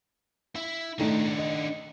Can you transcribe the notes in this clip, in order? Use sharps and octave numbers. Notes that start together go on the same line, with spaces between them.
E4
A2 D#3 A3 D4 D#4
D#5